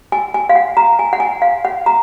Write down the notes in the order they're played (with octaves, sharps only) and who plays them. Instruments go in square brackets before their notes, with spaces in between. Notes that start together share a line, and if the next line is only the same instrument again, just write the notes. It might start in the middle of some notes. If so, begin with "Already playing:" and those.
[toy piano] G#5
G#5
F5
F#5
A#5
G#5
F#5
G#5
F5
F#5
A#5